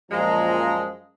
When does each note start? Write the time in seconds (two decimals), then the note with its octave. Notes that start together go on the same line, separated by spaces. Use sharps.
0.11 F#2 A#2 F3 G#3 A#5